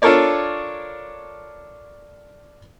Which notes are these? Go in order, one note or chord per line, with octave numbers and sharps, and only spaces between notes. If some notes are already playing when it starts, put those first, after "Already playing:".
D4 F4 A4 A#4 C#5 D5